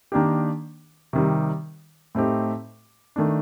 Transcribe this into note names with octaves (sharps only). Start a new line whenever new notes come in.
D#3 A#3 D4 G4
C3 D#3 G3
A2 A3 C4 D#4 G4
D#3 A3 D4